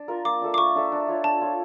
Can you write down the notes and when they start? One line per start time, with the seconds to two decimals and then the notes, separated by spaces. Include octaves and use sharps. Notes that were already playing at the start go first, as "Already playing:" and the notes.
Already playing: D4
0.08 F4 A#4
0.25 A#3 D6
0.41 D4 A4 E5
0.54 D6
0.58 A#3 C#6
0.75 D4 A4 E5
0.92 D4
1.08 F4 C#5
1.24 D4 A5
1.41 F4 C#5